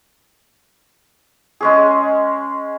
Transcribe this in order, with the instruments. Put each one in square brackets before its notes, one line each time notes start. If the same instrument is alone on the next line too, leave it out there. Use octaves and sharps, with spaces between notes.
[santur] G#3 C#4 G#4